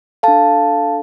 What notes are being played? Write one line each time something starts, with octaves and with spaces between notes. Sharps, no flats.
D4 A4 F5 A5